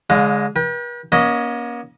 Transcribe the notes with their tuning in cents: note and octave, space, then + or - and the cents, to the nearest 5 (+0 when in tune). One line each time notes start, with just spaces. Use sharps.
D3 -35 G#3 +0 F5 +30
B4 -45 G5 +15
A#3 +40 C#4 +15 D#5 +0